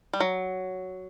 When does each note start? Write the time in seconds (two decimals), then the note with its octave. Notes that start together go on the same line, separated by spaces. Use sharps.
0.13 G3
0.20 F#3